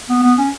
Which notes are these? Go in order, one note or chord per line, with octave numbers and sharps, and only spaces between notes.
B3
B3
C#4